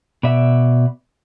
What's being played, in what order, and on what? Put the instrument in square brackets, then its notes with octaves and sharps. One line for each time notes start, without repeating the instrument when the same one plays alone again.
[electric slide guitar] B2 D5 E5